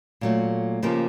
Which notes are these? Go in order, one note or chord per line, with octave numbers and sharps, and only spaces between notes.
A#2 F#3 A3
C#3 F3 A#3 D#4 G4